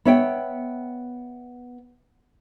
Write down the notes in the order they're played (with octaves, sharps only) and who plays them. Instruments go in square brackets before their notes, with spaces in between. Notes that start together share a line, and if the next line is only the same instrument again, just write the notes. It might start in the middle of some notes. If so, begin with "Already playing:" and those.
[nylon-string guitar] B3 C#5 E5 F#5 G5